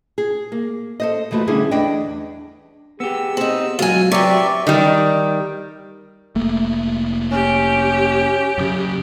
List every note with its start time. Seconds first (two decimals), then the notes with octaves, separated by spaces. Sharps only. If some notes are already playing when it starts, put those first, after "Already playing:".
0.18 G#4
0.52 A#3
1.00 A4 C5 D#5
1.31 D#2 E3 A3 F4 F#4
1.47 D3 G3 C#4 D4 E4 G#4
1.71 E2 A3 D4 D#5 G5
3.00 B3 G4 G#4 E6
3.37 C4 D#4
3.79 C#2 F#3 F4 F#4 G#5
4.12 F#2 C3 F#3 B4 D5 E5 G5 C#6
4.67 D#3 G3
6.35 F1 A3 A#3
7.32 C#4 G4
8.58 F#2 C#3